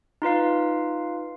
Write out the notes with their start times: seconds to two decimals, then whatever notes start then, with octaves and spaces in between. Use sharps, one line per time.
0.22 D#4 F4 B4 F5